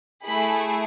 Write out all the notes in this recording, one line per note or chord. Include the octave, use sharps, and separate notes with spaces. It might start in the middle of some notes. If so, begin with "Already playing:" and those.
A3 E4 G#4 B5